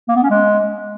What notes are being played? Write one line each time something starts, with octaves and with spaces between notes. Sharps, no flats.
A#3
B3
C#4
G#3